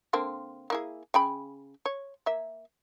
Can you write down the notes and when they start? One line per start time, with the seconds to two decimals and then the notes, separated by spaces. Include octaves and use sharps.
0.13 D3 A#3 C4
0.70 A#3 E4 G#4
1.14 C#3 G5 B5
1.86 C#5
2.26 A#3 E5